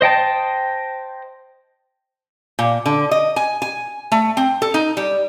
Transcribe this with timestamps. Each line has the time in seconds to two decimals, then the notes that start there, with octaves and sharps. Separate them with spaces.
0.01 C5 D#5 G5 A5
2.59 A#2
2.86 D3
3.11 D#5
3.36 G#5
3.62 G#5
4.12 A3
4.37 C4
4.62 A4
4.74 D#4
4.97 G3